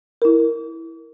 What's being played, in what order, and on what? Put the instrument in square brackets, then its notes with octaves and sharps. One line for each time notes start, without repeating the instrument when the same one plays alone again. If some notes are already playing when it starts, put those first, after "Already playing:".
[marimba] E4 A#4